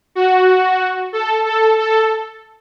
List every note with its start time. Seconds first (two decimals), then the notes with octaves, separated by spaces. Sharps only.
0.15 F#4
1.13 A4
1.45 A4
1.78 A4